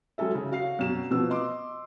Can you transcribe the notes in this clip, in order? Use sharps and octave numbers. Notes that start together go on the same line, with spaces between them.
F#3 G#3 C#4 A4 E5
C#3
F#4 F5 C7
F#2 B2 E7
B2 F3 B3 E6
D#5 C6 D6